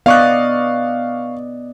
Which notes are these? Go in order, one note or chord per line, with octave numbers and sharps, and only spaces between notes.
B3 D5 D#5 F5 C#6 F#6